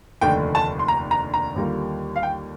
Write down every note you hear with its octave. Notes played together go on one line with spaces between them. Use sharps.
F1 D#2 D3 A3 D4 G5
A5
C6
A#5
A#5
A#5
D#2 D3 G3 A#3 F4
F5
G5